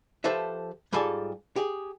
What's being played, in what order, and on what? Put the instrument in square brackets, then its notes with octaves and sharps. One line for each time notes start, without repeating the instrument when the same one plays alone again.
[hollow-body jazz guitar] F3 G4 A4 B4 C5 E5
G#2 G3 F4 A4 D5 G#5
G4 G#4